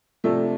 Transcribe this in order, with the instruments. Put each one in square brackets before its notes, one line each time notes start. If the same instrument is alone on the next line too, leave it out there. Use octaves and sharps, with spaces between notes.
[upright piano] C3 F3 A3 D4